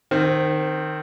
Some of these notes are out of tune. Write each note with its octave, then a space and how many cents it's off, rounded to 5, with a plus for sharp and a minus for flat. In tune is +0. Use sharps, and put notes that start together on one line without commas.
D#3 -15 C4 +0